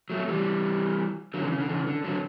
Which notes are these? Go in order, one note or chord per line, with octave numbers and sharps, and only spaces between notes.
F#3 A3
E3 G3
D3 F#3
C#3 E3
C#3
D3
C#3 E3
D3
D3 F#3